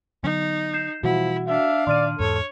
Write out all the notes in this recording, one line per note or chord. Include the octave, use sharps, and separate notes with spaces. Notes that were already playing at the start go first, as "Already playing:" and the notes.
D3 F#3 B3 D#4
G6 C7 E7
B2 E3 F3 G3 E4 F#4 F#5
D4 E5 F5
A#2 D#3 D5 C6 F6 D#7
E2 G#2 A4 C#5